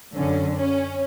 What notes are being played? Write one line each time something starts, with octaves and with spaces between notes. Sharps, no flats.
F#2 D3 C#4
C#4